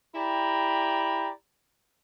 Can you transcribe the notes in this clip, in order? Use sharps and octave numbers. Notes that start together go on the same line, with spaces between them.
E4 G4 D5 G5 A#5 B5